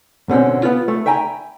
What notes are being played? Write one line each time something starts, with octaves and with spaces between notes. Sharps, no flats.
B2 D3 C4 C#4
B3 F4
A3
E5 G5 G#5 A#5 B5